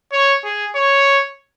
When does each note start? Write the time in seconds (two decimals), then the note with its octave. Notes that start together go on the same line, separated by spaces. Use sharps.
0.12 C#5
0.44 G#4
0.76 C#5